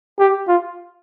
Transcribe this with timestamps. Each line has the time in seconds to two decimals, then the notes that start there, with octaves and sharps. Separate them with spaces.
0.19 G4
0.48 F4